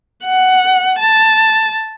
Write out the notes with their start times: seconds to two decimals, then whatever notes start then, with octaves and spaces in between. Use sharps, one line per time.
0.24 F#5
0.99 A5